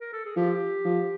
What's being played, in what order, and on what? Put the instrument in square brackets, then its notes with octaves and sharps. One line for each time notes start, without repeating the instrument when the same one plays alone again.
[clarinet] A#4
A4
G#4
[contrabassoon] F3 [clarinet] G4
[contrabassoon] F3